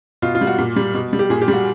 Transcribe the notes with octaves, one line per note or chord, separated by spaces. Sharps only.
B2 F4
F4
G3
F#4
A#2
G3
B2
G3
G4
A#2 G#4
G4
G3
F#4